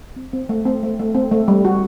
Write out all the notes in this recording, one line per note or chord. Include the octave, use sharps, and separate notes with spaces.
C4
C4
A3
C4
A3
A3
C4
A3
G3
F#4